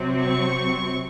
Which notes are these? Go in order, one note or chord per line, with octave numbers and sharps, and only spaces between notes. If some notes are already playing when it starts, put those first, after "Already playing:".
Already playing: C3 F#3 C4
C#6